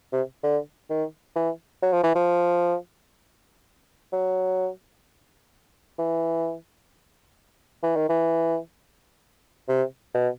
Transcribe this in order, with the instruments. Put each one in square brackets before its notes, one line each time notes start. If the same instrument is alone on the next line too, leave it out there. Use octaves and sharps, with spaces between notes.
[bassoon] C3
D3
D#3
E3
F#3
F3
E3
F3
F#3
E3
E3
D#3
E3
C3
B2